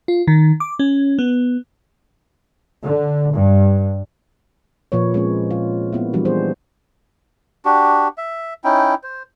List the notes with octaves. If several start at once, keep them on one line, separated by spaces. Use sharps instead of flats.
F4
D#3
D6
C#4
B3
D3
G2
A#2 F3 A#3 B4 C#5
G#3 C4 C#4
F4
A#3 B3 E4
E3 F3 G3 D4 F#4
B3 G#4 C5
D4 F#4 G4
E5
C#4 D#4 E4 G5
C5